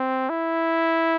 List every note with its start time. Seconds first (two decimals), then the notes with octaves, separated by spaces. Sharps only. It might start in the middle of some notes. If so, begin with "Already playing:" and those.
Already playing: C4
0.29 E4